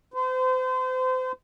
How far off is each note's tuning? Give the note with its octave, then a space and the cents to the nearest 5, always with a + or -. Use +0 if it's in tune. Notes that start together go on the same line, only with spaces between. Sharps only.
C5 -35